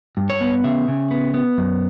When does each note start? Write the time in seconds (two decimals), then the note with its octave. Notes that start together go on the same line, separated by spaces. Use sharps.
0.17 G2
0.30 C#5
0.41 B3
0.64 C#3 E5
0.88 C#3
1.11 B3
1.34 B3
1.58 F#2